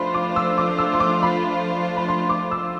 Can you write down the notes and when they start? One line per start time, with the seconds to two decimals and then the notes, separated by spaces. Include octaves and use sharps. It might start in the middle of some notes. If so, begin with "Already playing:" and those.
Already playing: F3 A3 D4 F4 C5 B5 C6
0.14 D6
0.36 E6
0.58 D6
0.79 E6
0.93 C6
1.00 D6
1.23 B5
1.97 B5
2.09 C6
2.29 D6
2.51 E6